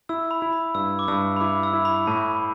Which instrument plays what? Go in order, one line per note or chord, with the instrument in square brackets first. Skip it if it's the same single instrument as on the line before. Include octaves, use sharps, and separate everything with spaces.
[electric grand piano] E4 [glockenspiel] E6
[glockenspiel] B5
[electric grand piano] E4
[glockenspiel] B5
[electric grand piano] G2 [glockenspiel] E6
[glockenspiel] D6
[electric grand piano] G2 [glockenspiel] E6
[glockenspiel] B5
[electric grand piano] E4 [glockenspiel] D6
[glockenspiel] E6
[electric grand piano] E4
[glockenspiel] B5
[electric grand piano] A2 [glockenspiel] A5